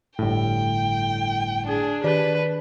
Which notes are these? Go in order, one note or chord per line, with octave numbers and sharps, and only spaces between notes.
G1 A2 G5
D4 G#4
D#3 G4 B4 D5